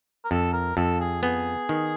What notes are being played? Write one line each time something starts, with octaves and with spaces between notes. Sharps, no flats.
A#4
F2 A4
A#4
F2 A4
G#4
B3 G#4
D#3